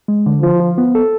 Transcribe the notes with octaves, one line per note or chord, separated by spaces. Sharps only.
G#3
D3
F3 F4
F4
B3
A4